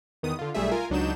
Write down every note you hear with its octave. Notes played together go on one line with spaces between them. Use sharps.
E2 D#3 B3 D#6
D3 F4
B1 G3 A3 G#4 E5
F4 A#4 G#5
C#2 F#3 D4 D#4 G6 E7